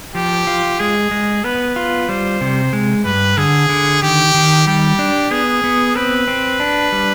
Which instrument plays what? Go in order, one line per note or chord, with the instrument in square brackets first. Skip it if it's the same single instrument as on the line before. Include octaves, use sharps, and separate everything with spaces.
[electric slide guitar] F3 [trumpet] G4
[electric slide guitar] F4
[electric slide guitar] G#3 [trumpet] G#4
[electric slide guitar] G#3
[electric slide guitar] B3 [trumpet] B4
[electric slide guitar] F4
[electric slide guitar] G3 [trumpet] C5
[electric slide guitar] C3
G#3
[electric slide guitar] G2 [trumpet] B4
[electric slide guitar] D3 [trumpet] G#4
[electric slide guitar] D3
[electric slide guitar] D#3 [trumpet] G4
[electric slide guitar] D#3
[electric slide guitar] G3 [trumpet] G4
[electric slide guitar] D4
[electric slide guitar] B3 [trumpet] G#4
[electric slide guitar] B3
[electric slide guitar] C4 [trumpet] B4
[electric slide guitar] C4
D4
G3